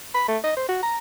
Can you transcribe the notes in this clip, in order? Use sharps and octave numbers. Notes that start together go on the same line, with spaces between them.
B5
A3
D#5
C5
F#4
A#5